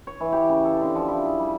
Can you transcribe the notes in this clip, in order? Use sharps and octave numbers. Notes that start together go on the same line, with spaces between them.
C#5
E3
G4
C#3
A4
D3
F3
E4
G#4
G3